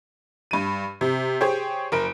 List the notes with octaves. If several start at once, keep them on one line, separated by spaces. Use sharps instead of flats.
G2 D#7
C3
G4 G#4 C5 C#5 G5
F#1 A#4 D7